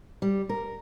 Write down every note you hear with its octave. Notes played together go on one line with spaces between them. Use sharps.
G3
A#4